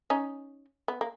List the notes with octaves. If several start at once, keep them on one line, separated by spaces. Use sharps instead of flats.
C#4 D#4
B3
A#3